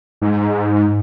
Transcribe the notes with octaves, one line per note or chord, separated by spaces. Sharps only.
G#2